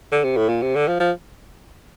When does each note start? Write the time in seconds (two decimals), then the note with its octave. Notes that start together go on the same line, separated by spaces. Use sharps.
0.12 D3
0.24 C3
0.37 A2
0.49 A#2
0.62 C3
0.75 D3
0.88 F3
1.00 F3